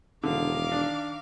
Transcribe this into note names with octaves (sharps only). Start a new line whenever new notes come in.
E1 D3 D#3 F5 D6
D4